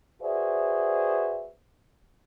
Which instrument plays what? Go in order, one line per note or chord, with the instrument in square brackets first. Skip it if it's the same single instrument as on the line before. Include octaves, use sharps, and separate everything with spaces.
[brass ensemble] F#4 G#4 B4 C5 D5 E5